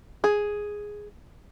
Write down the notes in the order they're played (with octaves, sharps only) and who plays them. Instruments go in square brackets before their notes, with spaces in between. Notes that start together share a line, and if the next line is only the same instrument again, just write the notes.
[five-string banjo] G#4